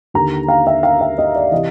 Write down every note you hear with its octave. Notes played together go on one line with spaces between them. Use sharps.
D#2 D3 A#5
F5
E5
F5
E5
D#5
D5
C3 E3 D#5